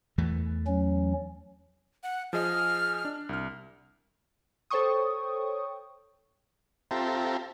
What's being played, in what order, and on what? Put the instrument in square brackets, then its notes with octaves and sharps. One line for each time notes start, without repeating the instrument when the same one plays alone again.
[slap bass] E2 E3 A3
[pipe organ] F#3 C#4
[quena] F#5
[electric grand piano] F3 G#4 D#5 [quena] F6
[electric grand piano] D4
C2 F6
[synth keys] A4 C5 C#5 G5 C#6 D#6
[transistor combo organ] C4 F4 G4 A4 E5 A#5